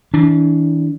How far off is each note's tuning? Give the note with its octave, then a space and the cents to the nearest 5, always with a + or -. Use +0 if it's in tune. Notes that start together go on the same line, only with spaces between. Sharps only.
E3 -40 D4 -35